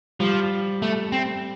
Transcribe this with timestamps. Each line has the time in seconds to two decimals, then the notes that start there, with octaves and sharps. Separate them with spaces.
0.20 F3 G3
0.82 A3
1.12 C4